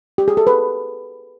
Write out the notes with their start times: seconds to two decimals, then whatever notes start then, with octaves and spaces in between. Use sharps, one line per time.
0.18 G4
0.28 G#4
0.37 A4
0.47 B4